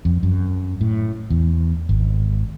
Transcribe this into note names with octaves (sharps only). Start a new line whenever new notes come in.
F2
F#2
A2
E2
G#1